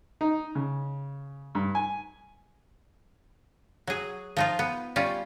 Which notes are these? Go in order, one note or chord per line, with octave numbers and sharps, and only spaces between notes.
D#4
C#3
G2
G#5
F#3 G#4
F3 D#4 F4
B3
G3 C#4 F4